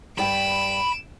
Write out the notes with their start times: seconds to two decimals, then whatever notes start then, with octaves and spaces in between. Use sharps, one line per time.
0.18 G2 D5 G5 B5 D7 E7